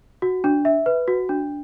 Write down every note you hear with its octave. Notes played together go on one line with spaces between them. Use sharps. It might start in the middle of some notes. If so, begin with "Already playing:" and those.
F#4
D4
E5
B4
F#4
D4